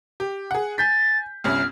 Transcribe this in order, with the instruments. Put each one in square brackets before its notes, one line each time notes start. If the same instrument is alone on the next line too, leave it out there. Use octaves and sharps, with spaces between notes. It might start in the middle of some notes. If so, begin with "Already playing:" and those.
[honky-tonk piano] G4
G#4 F#5
[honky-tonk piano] G#5 G6 B6 [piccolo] A6
[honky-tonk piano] G1 C2 C#4 [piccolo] F6